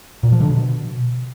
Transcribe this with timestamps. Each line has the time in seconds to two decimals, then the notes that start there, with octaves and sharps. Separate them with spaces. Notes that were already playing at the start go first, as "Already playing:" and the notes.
0.23 A#2
0.32 F3
0.41 D3
0.50 B2